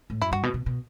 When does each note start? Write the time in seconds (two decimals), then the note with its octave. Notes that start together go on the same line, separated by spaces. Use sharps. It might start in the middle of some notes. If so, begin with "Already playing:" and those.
0.10 A2
0.22 F#2 E4
0.32 G2 F#4
0.43 B2
0.54 B2
0.66 B2